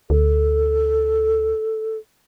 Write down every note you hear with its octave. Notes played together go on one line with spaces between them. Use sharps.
D2 A4